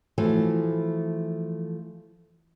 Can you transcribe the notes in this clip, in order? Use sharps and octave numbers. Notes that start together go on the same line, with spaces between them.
E3 F3 A3 F#4